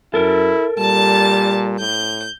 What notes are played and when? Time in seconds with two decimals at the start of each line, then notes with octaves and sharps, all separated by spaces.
0.14 F#2 E4 A4 A#4
0.79 A#2 G3 A5 A6
1.79 A2 G6